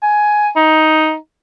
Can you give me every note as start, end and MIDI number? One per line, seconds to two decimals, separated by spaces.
0.03 0.49 80
0.56 1.15 63